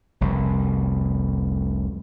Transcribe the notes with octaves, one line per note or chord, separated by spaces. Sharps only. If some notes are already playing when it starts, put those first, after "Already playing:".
F1 C2